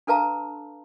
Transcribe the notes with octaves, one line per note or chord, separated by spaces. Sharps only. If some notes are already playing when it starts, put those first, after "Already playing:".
D4 A4 B4 F5 A5 A#5